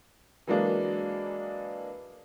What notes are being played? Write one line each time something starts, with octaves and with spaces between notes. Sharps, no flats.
E3 F#3 G#3 A#3 D4